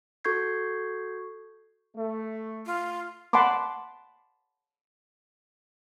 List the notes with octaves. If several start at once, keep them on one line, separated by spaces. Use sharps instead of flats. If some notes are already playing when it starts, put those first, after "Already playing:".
F#4 A4 C#6 G6 G#6 C7
A3
F4
F#5 A5 B5 C6 D6